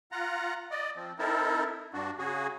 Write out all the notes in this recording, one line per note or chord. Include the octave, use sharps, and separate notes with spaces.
F4 F#5 A#5
D5 D#5
F3 C4
C4 D#4 E4 A4 A#4
G2 D4 F#4
C#3 F#4 G#4